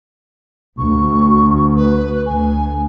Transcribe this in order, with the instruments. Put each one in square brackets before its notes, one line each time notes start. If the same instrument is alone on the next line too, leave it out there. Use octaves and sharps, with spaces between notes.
[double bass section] D2 [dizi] C#6
[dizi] B4
[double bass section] D2 [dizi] G#5